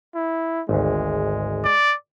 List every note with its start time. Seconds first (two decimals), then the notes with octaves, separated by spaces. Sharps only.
0.15 E4
0.69 G#1 D2 G#3
1.64 D5